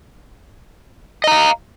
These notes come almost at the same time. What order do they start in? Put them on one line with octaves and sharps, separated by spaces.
D#5 A#5 F5